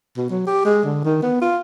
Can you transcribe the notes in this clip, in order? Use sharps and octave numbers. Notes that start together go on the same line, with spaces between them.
B2
F#3
G4
G#3
D3
D#3
B3
F4